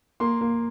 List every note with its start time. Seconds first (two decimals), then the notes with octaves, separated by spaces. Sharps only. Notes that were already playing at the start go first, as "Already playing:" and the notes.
0.20 A#3 C6
0.41 A#3